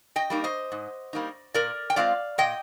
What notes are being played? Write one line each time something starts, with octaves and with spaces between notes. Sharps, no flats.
D#5 G5
G3 A#3 D#4
C5 D#5
G#2
G3 A#3 D#4
A#2 A#4 D5
G5
G#3 C4 F4 D5 F5
A#2 D#5 G5